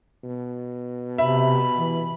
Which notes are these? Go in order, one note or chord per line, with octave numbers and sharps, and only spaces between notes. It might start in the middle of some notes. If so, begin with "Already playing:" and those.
B2
C3 E5 B5
E3